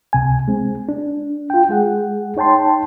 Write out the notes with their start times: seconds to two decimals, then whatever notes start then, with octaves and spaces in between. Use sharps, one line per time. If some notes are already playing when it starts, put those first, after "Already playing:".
0.13 C#2 C3 G#5
0.48 G#3 C4
0.89 D4
1.50 F4 G5
1.69 G#3 G#4 F#5
2.37 D#4 C#5 G5 A5 C6